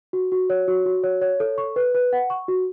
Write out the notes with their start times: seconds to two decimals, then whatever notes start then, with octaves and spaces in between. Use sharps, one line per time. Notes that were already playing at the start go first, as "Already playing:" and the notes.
0.13 F#4
0.32 F#4
0.50 C#5
0.68 F#4
0.86 F#4
1.04 C#5
1.21 C#5
1.40 A4
1.58 C#6
1.76 B4
1.94 B4
2.13 F#5
2.30 C#6
2.48 F#4